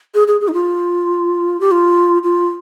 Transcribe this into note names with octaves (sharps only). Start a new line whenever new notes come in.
G#4
G#4
G#4
D#4
F4
G4
F4
F4